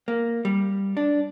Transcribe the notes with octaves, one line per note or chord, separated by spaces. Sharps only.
A#3
G3
D4